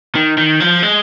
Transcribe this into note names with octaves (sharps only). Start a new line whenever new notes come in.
D#3
D#3
F3
G#3